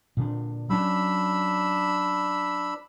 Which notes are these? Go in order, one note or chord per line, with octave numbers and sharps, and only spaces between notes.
A#2 D3 D4
F#3 C#4 D4 B5 E6